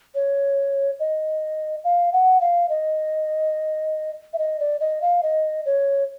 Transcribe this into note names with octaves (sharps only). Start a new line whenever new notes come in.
C#5
D#5
F5
F#5
F5
D#5
E5
D#5
D5
D#5
F5
D#5
C#5